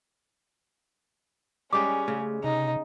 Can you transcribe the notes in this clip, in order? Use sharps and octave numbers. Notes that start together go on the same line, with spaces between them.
G3 G#3 C#4 G4 D6
C#3 A3
C3 D#4